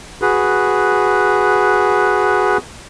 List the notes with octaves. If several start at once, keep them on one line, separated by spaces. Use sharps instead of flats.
F#4 G#4 B4